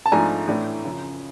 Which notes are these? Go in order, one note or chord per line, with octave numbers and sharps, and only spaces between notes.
A5
G#2 F3 A3 D4 G#5 A#5
A2 E3 A3 D4
F#2 C#3 F3